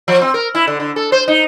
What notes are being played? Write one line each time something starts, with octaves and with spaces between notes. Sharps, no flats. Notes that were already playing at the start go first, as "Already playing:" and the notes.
F3
C4
A#4
E4
D3
D3
A4
C5
D#4